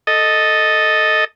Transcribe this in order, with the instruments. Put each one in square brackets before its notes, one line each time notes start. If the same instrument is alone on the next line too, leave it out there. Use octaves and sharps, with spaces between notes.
[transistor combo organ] A4 D#5